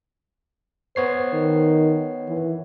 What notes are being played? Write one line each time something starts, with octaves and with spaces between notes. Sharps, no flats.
B3 C5 C#5 C7
D#3
E3